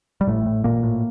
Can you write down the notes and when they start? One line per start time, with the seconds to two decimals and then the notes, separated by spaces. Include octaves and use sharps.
0.21 G3
0.27 A1 A2 A3
0.46 A2
0.64 A1 A#2 A#3
0.83 A2